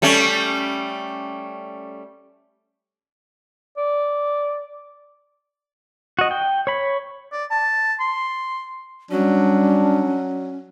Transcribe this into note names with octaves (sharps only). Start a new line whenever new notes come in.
G3 A3 C#4
D5
F#4 D#5
G5
C#5 B5
D5
A5
C6
F#3 G3 C#4 D4